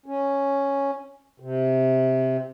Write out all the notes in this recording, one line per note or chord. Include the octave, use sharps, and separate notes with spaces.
C#4
C3